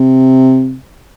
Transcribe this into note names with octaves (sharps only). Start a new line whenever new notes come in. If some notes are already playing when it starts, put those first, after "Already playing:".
Already playing: C3